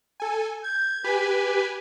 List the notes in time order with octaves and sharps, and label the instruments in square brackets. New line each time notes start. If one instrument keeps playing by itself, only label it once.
[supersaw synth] A4 G#5
[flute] G6 [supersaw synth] G#6
[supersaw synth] G4 B4 G#5 [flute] B6